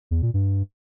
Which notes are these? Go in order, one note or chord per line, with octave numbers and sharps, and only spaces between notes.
E2
A#2
G2